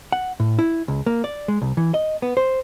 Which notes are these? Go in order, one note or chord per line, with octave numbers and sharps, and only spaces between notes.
F#5
A2
E4
C#2
A#3
D5
G#3
C2
E3
D#5
B3
C5